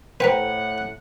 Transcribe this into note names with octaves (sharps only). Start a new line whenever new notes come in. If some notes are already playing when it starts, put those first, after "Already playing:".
A2 B4 C5 F#5 G5 A#5